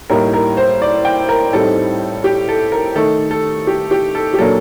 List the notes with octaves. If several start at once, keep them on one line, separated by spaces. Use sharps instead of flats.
A2 G3 A#3 D#4 A#4
A#4
C5
D5
G5
A#4
A2 G3 C4 D#4 A4
G4
A4
A#4
D#3 A3 D#4 A4
A4
G4
G4
A4
G4
A#2 F#3 A#3 D4 A4